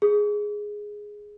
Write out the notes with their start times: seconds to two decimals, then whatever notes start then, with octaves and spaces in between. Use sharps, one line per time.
0.02 G#4